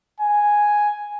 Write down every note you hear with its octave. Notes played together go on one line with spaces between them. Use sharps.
G#5